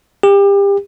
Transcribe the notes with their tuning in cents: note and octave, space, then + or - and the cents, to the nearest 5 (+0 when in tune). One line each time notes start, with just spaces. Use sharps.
G4 +30